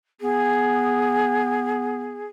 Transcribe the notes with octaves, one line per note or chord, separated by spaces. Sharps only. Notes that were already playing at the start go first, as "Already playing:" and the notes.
B3 G#4